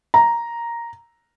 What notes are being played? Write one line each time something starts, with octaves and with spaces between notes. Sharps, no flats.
A#5